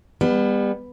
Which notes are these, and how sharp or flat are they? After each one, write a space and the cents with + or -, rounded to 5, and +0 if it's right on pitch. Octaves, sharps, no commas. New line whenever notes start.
G3 +35 B3 +0